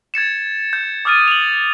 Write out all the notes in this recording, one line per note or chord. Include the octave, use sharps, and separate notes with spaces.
G#6 A6 C#7 E7
G6
D6 D#6 F6 A6 D#7
F7 F#7